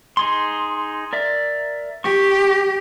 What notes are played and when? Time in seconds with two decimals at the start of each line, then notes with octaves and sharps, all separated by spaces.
0.17 D#4 G#4 C6
1.13 A#4 D5 E5
2.04 G4 C#6